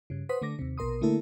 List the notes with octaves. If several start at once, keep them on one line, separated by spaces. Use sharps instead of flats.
G2 C#3
B4 C5 F#5 C6 D#6 B6
D3 A3 D6 A#6
D#2 C3
A#1 B2 A#4 C6 D#6
D3 A3 A#3 E4 A4 A#4